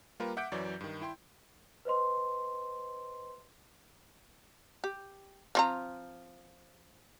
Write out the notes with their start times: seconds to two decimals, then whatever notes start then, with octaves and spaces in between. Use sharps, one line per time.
0.20 G3 A#3 F4 G4 A#4 B4
0.37 E5 F#5 D6 G6 B6 D7
0.52 F#2 E3 F#3 C#5 D5
0.81 G2 D#3
1.01 E4 G5 C6
1.85 B4 C5 D#5 C6
4.84 G4
5.55 F3 C4 A#5